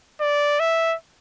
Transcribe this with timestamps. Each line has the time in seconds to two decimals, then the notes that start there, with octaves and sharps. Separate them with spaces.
0.20 D5
0.60 E5